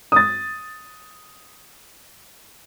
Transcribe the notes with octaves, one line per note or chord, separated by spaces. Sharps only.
D#6 A6